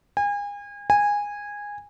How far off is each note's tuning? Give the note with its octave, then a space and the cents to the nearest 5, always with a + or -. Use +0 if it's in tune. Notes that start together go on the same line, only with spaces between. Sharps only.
G#5 -35
G#5 -15